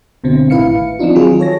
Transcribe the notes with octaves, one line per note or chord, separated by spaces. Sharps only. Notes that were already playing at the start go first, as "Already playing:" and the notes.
C#2 B2 D3 C4
G#1 A2 E4 B4 F5 C#7
F3 C4 D4 D#4 F4
D#3 F#3 F4 G#4
A4 C#5 A#6